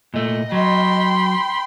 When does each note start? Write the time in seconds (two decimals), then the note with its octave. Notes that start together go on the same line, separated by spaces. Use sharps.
0.14 A#2 A3 D#5
0.52 F#3 G5 B5 C6